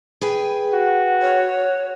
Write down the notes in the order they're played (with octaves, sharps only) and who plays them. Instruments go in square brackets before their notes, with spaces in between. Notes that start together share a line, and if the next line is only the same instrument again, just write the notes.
[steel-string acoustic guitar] G#4 B4 G5
[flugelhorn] F#4
[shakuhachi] C#5